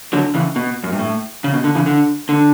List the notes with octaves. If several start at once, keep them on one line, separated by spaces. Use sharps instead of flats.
D3 F#3
C#3 E3
B2
F#2
G2
A2
C#3
B2
D3
C#3 E3
D3
D3